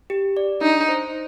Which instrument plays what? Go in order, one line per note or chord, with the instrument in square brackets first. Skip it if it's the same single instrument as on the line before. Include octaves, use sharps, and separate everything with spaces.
[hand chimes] G4
D5
[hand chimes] D4 [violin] D#4
[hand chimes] C5